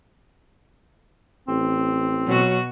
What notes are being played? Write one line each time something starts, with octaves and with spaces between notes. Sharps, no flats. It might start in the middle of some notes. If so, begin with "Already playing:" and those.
A1 C4
B2 F#3 F#4